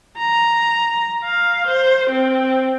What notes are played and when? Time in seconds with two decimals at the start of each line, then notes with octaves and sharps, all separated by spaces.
0.18 A#5
1.24 F5
1.67 C5
2.10 C4